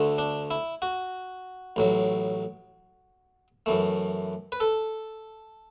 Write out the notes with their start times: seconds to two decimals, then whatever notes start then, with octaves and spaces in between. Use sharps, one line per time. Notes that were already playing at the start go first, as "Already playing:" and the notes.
Already playing: D2 D3 A3
0.18 D4
0.51 E4
0.82 F#4
1.76 A1 A2 F#3
3.66 F#2 E3 A3
4.52 B4
4.60 A4